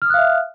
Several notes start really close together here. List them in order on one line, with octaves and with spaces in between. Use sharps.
F6 D#6 F#6 F5 E5